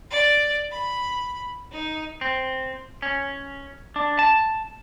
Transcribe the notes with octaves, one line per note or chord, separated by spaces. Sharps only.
D5
B5
D#4
C4
C#4
D4
A5